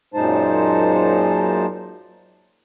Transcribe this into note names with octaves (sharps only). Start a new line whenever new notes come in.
F#2 A#2 G#3 D#4 C5 A5